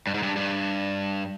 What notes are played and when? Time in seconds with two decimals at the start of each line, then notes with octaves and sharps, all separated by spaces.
0.07 G2
0.14 G#2
0.23 G2
0.36 G2